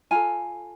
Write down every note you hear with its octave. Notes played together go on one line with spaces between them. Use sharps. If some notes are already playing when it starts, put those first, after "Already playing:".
F4 A4 G#5 A#5